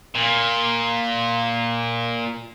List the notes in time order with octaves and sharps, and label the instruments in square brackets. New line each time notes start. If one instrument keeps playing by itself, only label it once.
[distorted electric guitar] A#2